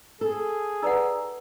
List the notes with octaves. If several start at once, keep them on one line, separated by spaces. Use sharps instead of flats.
G#4 A4
D#4 B4 D5 F#5 A#5 E6